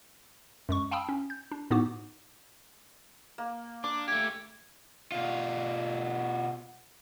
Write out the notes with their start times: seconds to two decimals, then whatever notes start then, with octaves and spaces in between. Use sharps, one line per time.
0.69 F#2 G#3 C#6
0.91 F5 G5 A5 B5 D#6 E6
1.09 C#4
1.30 G6
1.52 D4
1.71 A2 B3 D#4 F#4 D6
3.38 A#3
3.84 D4 D6
4.08 A3 G4 G#6
5.12 B2 F4